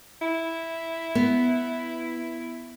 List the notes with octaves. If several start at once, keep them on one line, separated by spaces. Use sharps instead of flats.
E4
B3